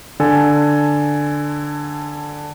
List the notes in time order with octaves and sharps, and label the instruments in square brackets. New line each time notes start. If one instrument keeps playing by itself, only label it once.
[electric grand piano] D3 A4 G#5